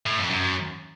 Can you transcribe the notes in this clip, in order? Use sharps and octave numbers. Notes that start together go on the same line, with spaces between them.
A2
F2
F#2